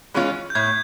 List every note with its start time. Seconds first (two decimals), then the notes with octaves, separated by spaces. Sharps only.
0.14 E3 G#3 C#4 F4
0.50 G6
0.55 A2 G#6